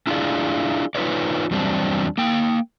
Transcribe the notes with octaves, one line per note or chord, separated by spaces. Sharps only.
D4 E4 F4 G#4 D5
D#4 F4 B4 C#5 D5
E2 F#3 G3 C4 D4
A#3 G5